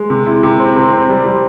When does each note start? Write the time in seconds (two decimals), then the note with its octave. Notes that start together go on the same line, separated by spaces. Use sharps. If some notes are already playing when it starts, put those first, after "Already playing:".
Already playing: G#3
0.10 C3
0.26 E4
0.43 C3
0.59 C4
0.76 C3
0.93 C4
1.09 G3
1.26 G3